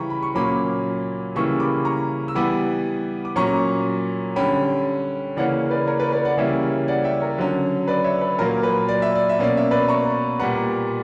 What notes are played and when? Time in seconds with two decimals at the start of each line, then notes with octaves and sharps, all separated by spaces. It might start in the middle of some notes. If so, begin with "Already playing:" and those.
Already playing: C#3 E3 G3 G5 A#5 B5 C#6
0.10 B5
0.22 C#6
0.35 A#2 F#3 A#3 C#4 B5 D6
1.35 C#3 E3 G3 A#3 C#6 E6
1.60 B5 D6
1.85 A#5 C#6
2.28 E6
2.35 E3 G3 B3 B5 D6
3.25 D6
3.36 A#2 F#3 C#4 A#5 C#6
4.36 D3 G3 C#4 G5 B5
5.37 C#3 E3 A#3 C#4 D5 F#5
5.71 B4 D5
5.87 A#4 C#5
6.00 B4 D5
6.12 B4 D5
6.25 D5 F#5
6.37 C#3 E3 G3 A#3 C#4 C#5 E5
6.88 D5 F#5
7.04 E5 G5
7.21 A#4 C#5
7.38 D3 F#3 C#4
7.88 B4 D5
8.04 C#5 E5
8.21 B4
8.39 A#2 F#3 A#3 A#4
8.63 B4
8.89 D5
9.02 E5
9.15 D5
9.29 E5
9.39 B2 A#3 C#4 D5
9.57 E5
9.71 B4 D5
9.88 A#5 C#6
10.39 A#2 G3 B3 F#5 A#5